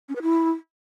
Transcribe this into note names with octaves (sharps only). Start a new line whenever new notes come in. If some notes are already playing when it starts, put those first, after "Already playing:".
C#4
B4
E4